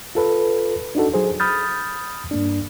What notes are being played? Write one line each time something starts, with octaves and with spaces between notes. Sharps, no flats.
F4 A4 B4
D4 D#4 F#4 A4
F#3 G#4 C5
B5 D#6 F6 G6 A6
G2 A#3 D4